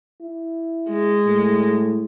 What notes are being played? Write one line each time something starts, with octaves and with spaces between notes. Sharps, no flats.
E4
G#3
A2